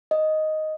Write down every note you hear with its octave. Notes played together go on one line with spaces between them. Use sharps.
D#5